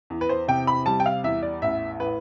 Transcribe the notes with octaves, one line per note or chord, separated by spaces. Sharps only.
E2
B4
C5
C3 G5
B5
G3 A5
G5
F5
E2 E5
D5
A1 E5
A2 B4